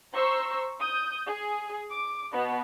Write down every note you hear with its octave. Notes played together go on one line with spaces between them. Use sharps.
C5 A#5 C#6 E6
D#6 G6
G#4
D6
B2 B3